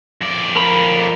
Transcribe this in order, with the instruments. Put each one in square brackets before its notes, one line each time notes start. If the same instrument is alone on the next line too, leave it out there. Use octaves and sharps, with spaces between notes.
[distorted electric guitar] F2 D5
[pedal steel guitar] A#4 A#5 B5